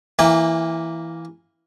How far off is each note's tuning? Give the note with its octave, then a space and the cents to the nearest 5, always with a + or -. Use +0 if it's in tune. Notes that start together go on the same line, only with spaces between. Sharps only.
E3 +0 A#3 +0 G#5 -45